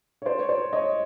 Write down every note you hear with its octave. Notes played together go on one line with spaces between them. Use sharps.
C#5
C5 D5
C#5
C5 D5
C#5 D#5